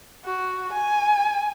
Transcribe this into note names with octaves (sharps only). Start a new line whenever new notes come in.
F#4
G#5